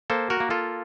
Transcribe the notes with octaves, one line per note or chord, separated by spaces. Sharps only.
A#3 A4 C5
F#4 A#4
A#3
F4 A4